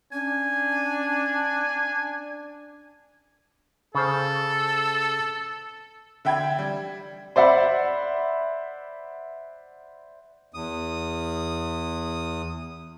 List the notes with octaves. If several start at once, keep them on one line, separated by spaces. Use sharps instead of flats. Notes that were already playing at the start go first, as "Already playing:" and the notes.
C#4 D4 G#5
C#3 A4 C5
D3 E5 G5 B5 G#6
G3
C5 D5 E5 F#5 B5
E2 D#6